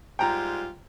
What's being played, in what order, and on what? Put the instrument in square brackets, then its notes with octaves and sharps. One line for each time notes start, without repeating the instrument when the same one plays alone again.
[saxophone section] G#2 G3 F4 [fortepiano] G5 A#5